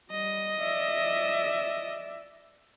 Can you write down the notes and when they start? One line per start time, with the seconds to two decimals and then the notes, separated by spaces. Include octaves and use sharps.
0.11 G3 D#5
0.60 D5 E5